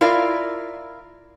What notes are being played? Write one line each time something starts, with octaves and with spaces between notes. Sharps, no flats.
E4 F4 A#4 D5 F5